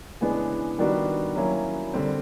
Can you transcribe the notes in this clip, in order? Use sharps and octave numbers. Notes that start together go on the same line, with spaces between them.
C#3 E3 G#3 B3 D4
D#3 G3 B3 D4 F#4
F#3 A#3 C#4 E4
D3 G3 C4